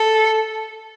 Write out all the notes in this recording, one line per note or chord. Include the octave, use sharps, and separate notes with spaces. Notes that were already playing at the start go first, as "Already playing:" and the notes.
Already playing: A4